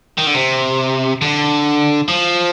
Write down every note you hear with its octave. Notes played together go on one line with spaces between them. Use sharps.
D#3
D3
C3
D3
F3